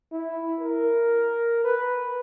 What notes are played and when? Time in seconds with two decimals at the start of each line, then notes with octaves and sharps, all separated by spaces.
0.12 E4
0.60 A#4
1.64 B4